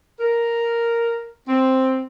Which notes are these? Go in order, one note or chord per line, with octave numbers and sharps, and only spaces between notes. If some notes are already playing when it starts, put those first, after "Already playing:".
A#4
C4